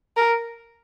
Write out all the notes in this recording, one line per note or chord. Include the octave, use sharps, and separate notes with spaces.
A#4